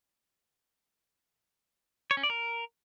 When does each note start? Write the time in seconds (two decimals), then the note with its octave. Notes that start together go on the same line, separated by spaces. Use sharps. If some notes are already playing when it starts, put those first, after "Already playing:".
2.11 C#5
2.17 C#4
2.23 D5
2.30 A#4